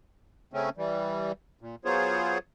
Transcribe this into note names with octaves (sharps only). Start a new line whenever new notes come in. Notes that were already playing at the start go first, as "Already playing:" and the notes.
C#3 A3 C4 C#4
E3 G3
A#2
F#3 B3 F4 G#4 C5 C#5